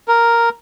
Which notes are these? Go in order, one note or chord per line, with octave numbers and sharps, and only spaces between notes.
A#4